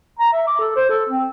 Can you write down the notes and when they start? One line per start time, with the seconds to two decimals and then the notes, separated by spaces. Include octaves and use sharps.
0.19 A#5
0.33 E5
0.47 D6
0.60 A4
0.76 C5
0.89 A4
1.09 C4